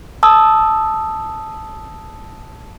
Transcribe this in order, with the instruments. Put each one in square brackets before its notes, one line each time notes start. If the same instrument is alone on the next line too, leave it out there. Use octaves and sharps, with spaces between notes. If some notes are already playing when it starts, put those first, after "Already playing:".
[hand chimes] A5 D#6 E6